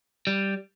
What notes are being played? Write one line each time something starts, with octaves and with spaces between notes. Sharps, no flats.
G3